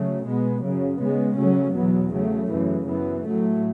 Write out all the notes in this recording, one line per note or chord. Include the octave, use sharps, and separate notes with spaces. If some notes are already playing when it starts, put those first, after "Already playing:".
Already playing: C#3 F#3 A3
B2 G#3 B3
F#2 C#3 F#3
C#3 G#3 B3
C#3 F#3 A3 C#4
E2 B2 F#3 B3
C#3 F#3 A3
F#2 C#3 E3
F#2 E3 B3
A2 F#3 A3